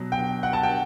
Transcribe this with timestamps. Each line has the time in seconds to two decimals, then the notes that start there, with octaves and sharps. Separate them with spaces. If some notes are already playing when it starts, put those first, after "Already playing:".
Already playing: B2 F#3
0.12 G5
0.43 F#5
0.53 A5
0.63 G5